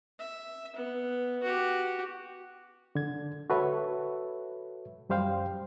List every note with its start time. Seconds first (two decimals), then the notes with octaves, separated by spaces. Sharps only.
0.19 E5
0.76 B3
1.43 F#4 G4
2.95 D3 G#6
3.50 F#4 A4 B4 C#5 E5
5.09 F#2 G3 C5 F5 G5